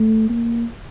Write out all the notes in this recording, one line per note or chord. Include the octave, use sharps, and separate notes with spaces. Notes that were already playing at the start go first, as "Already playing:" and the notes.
Already playing: A3
A#3